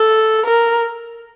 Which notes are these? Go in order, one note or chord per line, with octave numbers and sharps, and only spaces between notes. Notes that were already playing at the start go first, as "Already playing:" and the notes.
Already playing: A4
A#4